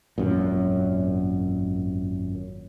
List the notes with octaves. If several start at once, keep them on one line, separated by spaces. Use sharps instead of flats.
G#1 F#2 A#2